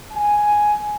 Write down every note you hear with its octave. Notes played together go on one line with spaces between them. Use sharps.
G#5